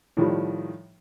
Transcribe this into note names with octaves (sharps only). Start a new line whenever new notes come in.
A2 D#3 F3 G3